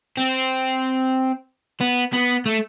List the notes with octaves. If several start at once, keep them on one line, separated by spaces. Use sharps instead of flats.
C4
B3
B3
A3